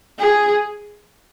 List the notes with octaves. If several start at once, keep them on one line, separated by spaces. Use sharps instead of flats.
G#4